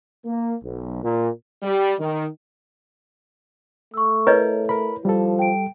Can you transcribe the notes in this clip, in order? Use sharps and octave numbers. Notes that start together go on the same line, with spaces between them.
A#3
B1
A#2
G3
D#3
A3 C#6 E6
E4 A#4 B4 C#5 D#5
A#4 B5
F3 G3 A4
G5 D7